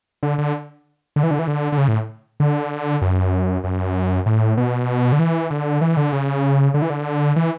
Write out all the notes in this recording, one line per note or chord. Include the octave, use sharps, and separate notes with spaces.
D3
D3
D3
E3
D3
E3
D3
D3
C#3
A2
D3
F#2
F#2
A2
B2
D3
E3
D3
E3
D3
C#3
D3
E3
D3
E3